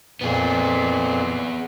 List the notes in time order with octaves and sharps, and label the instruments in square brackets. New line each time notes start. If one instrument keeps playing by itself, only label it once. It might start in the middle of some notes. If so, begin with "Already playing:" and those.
[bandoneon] F2 A#2 [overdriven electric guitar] B3 G#4